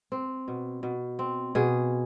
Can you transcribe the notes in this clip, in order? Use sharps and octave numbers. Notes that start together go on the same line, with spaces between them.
C4
B2
B2
C4
B2 G#4